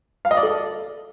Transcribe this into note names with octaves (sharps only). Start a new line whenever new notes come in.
F5
D#5
D5
A4